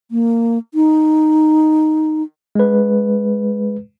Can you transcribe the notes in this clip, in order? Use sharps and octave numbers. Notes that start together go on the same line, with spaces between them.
A#3
D#4
G#3 B4